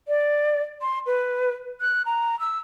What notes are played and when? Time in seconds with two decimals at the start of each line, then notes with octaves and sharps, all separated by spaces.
0.08 D5
0.82 C6
1.06 B4
1.81 F#6
2.06 A#5
2.40 E6